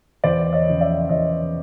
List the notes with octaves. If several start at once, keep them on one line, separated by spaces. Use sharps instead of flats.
E2 C5 D5
C#5 D#5
C#3 F3
D5 E5
E2 C#5 D#5